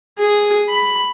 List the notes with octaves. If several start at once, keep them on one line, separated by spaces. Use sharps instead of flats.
G#4
B5